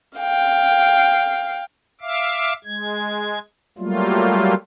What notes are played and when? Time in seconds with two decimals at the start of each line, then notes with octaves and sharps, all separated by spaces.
0.18 F5 G5
2.01 E5 F5 D6
2.65 G#3 G#6
3.78 F#3 G3 A3 A#3 F4